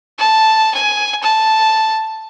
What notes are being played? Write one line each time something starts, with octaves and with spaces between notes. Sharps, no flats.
A5
G#5
A5